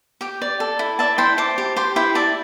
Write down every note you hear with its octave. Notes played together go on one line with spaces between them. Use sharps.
G4 G5
D5
A4
E4
D5 E5 A5
E4 G5 C6
C5 A5 D6
G4
G4 G5 C6
E4 G5 C6
D5 E5 A5